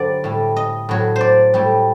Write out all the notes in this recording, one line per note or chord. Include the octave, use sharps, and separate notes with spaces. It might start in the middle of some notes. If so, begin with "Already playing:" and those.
Already playing: G2 D3 F#3 C5 D5
A2 G3
D#5
A2 F#3
C5 D5
A2 G3